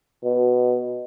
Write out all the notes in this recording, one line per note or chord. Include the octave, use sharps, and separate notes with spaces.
B2